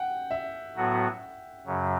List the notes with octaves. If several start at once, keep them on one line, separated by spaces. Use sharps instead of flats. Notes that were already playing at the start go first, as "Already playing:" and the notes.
Already playing: F#5 G5
E5
A2 F#3 B3 F#4
F#2 C#3 F#3